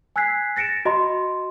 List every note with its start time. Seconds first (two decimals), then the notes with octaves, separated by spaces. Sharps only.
0.16 G#5 E6 F#6 G#6 B6 C7
0.56 A6 A#6 C#7 D7 E7
0.85 F#4 D#5 A#5 C6